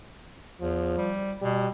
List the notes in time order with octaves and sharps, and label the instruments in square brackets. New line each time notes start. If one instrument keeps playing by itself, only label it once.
[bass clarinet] E2 [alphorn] F3
[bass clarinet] G3
[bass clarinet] B2 [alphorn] G3